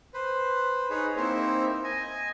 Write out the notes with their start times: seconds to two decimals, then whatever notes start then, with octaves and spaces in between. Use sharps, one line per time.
0.14 B4 C5
0.90 D#4 G#4 B4 C#5
1.17 A#3 C4 D#4 E4 C5 E5
1.84 D#5 G#5